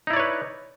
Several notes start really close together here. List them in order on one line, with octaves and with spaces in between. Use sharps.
D#4 E4 D5 C#5 B4